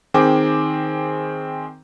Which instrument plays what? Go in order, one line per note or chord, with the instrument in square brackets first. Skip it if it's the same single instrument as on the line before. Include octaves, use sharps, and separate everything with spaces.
[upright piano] D#3 C4 G#4 D6